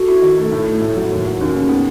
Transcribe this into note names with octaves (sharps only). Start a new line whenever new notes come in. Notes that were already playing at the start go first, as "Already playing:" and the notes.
Already playing: F#4 A4
E4
D#3
A3
A2 E4
A3
A2
F#3
D#2 E4
F#3
D#2 C#4
C#3
B3